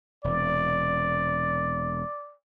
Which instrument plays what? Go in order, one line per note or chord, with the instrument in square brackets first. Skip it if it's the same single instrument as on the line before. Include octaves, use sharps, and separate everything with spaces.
[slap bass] E1 C3 [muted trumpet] D5